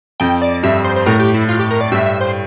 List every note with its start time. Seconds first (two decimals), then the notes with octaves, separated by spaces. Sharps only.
0.20 F2 G5
0.42 D5
0.63 G2 E5
0.84 C5
0.96 C5
1.06 A2 A#4
1.20 G4
1.34 E4
1.49 F4
1.59 G4
1.71 A#4
1.81 D5
1.92 G2 E5
2.06 E5
2.21 C5